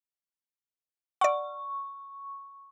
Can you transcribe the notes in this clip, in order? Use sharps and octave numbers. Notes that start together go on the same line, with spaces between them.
D5 F#5 C#6